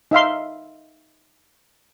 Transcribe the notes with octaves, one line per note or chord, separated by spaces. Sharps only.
D#4 E5 F5 C6